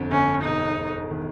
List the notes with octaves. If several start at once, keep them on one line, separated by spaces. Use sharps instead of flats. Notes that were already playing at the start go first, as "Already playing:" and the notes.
Already playing: G1 F2 D3
G1 C#4
E1 D#4
E1
D#3